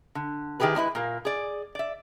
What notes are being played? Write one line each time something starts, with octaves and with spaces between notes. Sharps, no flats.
D3
D#3 E4 G4 G#4 B4
G#3 D4 E4 B4
A#2 A#3
G#4 D5
D5 E5